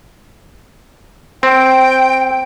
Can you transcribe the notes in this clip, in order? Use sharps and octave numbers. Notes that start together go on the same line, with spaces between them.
C4 G5